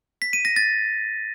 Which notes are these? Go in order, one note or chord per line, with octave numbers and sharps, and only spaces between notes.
B6
D#7
A#6
A6